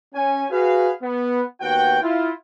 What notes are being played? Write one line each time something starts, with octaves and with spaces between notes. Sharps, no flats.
C#4 G#5
F#4 G#4 B4 F5
B3
D#2 B3 F#4 F#5 G5
E4 F4